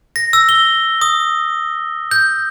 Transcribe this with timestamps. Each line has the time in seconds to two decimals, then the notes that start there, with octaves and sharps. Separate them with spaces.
0.16 A#6
0.33 E6
0.49 G7
1.02 D#6
2.11 G6